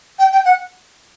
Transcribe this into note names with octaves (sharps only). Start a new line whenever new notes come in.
G5
G5
F#5